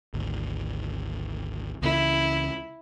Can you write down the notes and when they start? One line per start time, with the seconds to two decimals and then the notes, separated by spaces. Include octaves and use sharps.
0.14 G#1 D2
1.82 C#2 C#3 E3 E4